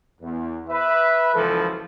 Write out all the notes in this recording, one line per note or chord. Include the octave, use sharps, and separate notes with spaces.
E2
B4 E5
F#1 C#2 E3 F3 A4